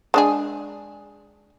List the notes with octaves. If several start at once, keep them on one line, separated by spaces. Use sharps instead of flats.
G#3 D4 G#4